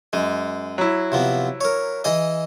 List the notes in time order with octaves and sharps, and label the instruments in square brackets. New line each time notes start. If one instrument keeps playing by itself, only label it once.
[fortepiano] F#2 [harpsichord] G#3
[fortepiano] F#3 E4
[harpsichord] C3 F3 B3
A#4 C#5
E3 G#4 D#5